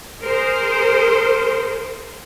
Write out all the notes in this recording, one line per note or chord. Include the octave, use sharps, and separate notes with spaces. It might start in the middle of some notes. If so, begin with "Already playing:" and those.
G#4 A#4 C5